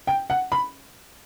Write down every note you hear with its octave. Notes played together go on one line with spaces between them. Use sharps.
G5
F#5
B5